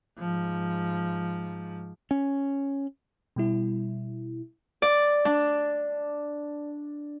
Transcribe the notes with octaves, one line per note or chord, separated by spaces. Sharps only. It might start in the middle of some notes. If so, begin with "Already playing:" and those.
G#2 F3
C#4
B2 G3 E4
D5
D4